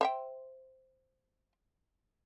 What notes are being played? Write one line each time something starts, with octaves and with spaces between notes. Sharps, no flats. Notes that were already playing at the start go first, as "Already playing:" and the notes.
C5 E5 G5